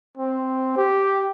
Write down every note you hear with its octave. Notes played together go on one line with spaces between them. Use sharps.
C4
G4